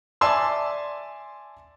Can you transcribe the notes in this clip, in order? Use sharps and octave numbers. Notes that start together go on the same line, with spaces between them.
D5 E5 G#5 A5 C6 E6